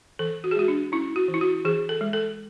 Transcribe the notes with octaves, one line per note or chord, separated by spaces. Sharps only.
E3 A4
F#4
G#4
G#3 F#4
D4
C#4 E4
F#4
E3
E4
F#4
E3 G#4
A4
G#3
A4